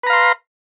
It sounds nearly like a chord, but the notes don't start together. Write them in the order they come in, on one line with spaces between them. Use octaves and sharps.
B4 A#5 F5 C6